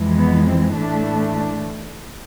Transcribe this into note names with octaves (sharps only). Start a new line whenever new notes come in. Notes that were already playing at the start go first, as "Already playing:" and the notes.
Already playing: F2 E3 G#3
B3
C4
A2 E3 A3 D4
D4